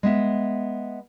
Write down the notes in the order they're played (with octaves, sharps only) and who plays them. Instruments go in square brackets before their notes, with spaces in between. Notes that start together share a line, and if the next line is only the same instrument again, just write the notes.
[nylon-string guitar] G#3 B3 E5